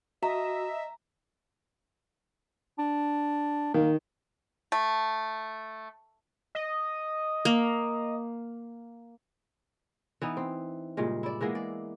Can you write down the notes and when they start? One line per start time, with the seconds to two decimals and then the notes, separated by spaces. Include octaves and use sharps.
0.23 F#4 D#5 E5 A#5
2.79 D4
3.74 D#3 A#3
4.72 A3
6.55 D#5
7.45 A#3
10.22 E3 B3 D#4
10.37 C4
10.97 G2 A#2 C#3 G#3
11.23 E4 D5
11.41 E3 G#3 A#3 B3
11.55 D5